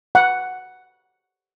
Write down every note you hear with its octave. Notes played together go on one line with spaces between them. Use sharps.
F#5